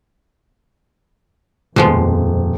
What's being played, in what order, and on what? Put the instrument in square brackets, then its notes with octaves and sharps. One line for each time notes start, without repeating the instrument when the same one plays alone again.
[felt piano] D#1 [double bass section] F2 [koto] B2 F3 G#3